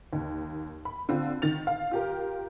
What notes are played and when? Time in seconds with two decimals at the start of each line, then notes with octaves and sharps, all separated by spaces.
0.13 D#2
0.85 B5
1.09 D3 C4 F4
1.42 D#3 A6 F7
1.67 F5
1.91 F4 G4 A#4